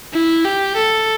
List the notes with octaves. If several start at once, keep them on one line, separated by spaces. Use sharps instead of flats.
E4
G4
A4